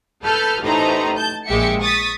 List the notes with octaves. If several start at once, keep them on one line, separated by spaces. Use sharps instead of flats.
A4 B4 A5 F6 G6
A1 A2 D#4 A4 C5 A#5
A5 G6
A#1 G#3 G4 E5 C#7
C#6 D#6 A6 B6